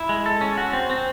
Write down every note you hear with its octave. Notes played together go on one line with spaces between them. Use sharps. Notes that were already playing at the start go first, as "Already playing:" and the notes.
Already playing: E4
G#3
A4
C#4
F#4
C4
C4